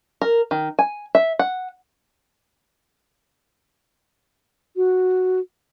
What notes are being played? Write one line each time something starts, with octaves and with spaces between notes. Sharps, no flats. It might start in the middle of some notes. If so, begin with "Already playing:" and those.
A#4
D#3
G#5
E5
F#5
F#4